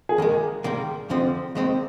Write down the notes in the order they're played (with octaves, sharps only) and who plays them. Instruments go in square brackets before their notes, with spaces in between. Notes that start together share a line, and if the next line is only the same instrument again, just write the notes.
[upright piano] G#4
[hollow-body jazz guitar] D#2 D#3 G#3 [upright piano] A#4
[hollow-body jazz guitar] G#2 D#3 G3 A#3
F2 D3 F3 C4
D#2 D#3 G#3 C4